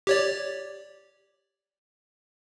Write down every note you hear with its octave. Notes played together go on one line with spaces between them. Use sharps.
G4 C#5 D5